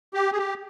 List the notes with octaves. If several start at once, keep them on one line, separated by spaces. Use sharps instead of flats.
G4
G#4
G4